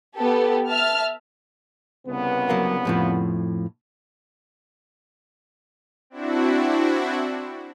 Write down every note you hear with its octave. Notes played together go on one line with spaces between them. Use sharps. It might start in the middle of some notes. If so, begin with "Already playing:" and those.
B3 G4 A4
E5 A5 F6
C2 C#3 B3
F#3 A#3 A#4
F2 A2 F3
C4 D4 E4 F#4